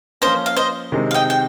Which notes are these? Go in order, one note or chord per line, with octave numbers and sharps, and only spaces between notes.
F3 A#3 C#4 C5 D#5
F5
C5 D#5
C3 D#3 G#3 C4 D#4
F5
D#5 G5
G5